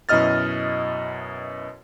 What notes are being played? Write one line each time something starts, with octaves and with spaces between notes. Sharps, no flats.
F#2 B2 E4 D#5 F6 A6